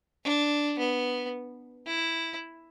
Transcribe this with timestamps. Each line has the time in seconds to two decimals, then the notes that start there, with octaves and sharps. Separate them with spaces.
0.25 D4
0.79 B3
1.87 E4